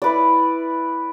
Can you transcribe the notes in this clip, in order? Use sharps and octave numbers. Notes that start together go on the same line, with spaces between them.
E4 B4 D5